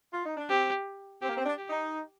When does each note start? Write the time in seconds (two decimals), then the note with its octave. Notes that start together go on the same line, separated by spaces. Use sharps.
0.12 F4
0.25 D#4
0.37 D4
0.50 C4 G4
1.22 C4 G4
1.29 A#3
1.37 C4
1.46 D4
1.58 G4
1.70 D#4